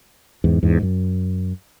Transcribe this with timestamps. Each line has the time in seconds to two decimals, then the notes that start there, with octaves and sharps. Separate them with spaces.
0.44 E2 G#2
0.63 E2 G#2
0.82 F#2